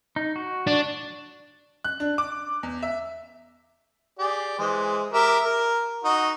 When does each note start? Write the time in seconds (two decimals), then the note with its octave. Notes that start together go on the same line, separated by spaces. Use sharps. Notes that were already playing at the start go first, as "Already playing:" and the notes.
0.16 D#4
0.36 F#4
0.67 D4
1.84 F#6
2.00 D4
2.18 D6
2.63 E2
2.83 E5
4.19 G4 G#4 D5
4.59 E3 G#3 C5
5.13 G4 A#4 E5
5.45 A#4
6.04 D#4 F#4